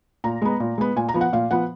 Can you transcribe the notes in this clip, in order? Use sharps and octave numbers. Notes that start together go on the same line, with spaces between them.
A#2 A#5
G#3 B3
A#2
G#3 B3
A#2 G#5
A#5
F3 B3
F#5
A#2 F5
F3 B3 F#5